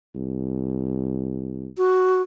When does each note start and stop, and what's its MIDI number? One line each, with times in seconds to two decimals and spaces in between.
0.15 1.69 36
1.78 2.22 66